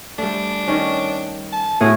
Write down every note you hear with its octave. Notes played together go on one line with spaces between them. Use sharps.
G3 A3 D4
D#3 C#4
A5
A2 F#4 G#4